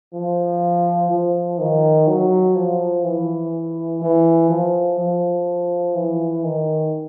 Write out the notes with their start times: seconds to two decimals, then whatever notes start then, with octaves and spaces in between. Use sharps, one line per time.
0.13 F3
1.10 F3
1.58 D#3
2.07 F#3
2.55 F3
3.04 E3
4.02 E3
4.50 F3
4.98 F3
5.95 E3
6.44 D#3